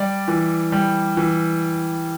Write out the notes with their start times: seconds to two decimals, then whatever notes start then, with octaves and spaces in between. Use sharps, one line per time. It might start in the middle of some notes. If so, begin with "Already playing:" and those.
Already playing: G3 D5
0.28 E3
0.72 G3
1.17 E3